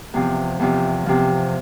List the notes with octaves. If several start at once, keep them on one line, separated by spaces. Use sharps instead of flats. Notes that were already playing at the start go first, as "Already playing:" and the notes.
E2 C3 F3
E2 C3 F3
E2 C3 F3